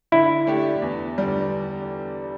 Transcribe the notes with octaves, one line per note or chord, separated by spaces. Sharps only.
D3 E4
A3 D4 G4
E2
D3 G3